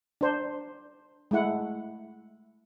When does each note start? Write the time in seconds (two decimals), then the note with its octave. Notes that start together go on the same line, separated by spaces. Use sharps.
0.21 D4 C5
1.31 G#3 A3 E4 F#5